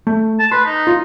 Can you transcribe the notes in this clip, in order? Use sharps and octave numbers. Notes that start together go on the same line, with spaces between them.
A3
A5
B4 C6
D#4
F4